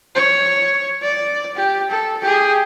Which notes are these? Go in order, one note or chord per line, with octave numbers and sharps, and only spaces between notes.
C#5
D5
G4
A4
G4 G#4